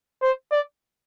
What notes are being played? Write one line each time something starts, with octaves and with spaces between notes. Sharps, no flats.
C5
D5